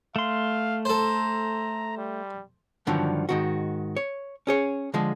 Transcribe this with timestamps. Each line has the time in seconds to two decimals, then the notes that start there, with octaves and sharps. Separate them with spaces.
0.16 A3 F5 C6
0.85 A4 C5 A#5
1.97 G3
2.87 G2 D3 D#3 F3 F#3
3.29 G#2 D#3 F#4
3.96 C#5
4.47 C#4 G#4 C#5
4.94 D3 F3 G#3